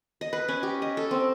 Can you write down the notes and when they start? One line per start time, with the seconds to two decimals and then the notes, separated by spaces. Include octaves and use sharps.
0.21 D#5
0.33 B4
0.48 C#4
0.63 G4
0.82 D#5
0.97 A4
1.11 C4